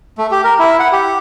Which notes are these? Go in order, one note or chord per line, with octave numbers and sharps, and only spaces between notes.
A3
G4
A#4
E4
F#5
G4